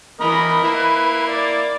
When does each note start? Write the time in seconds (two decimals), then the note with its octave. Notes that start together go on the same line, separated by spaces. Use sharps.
0.21 E3 A#4 D#5 B5
0.64 A#3 E4 B4
1.29 D5